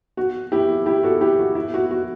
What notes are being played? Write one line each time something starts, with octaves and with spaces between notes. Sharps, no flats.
F#4
E4 G4
E4 G4
F#4 A4
E4 G4
F#4
E4
F#4
F#4